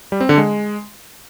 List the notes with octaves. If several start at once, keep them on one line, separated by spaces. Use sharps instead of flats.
G3
C4
D3
G#3